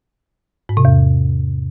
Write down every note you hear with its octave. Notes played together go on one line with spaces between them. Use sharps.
G#2
C3
E2